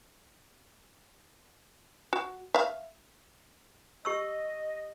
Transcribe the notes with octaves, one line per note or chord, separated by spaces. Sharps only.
F#4
E5 F5
G4 D#5 C#6 E6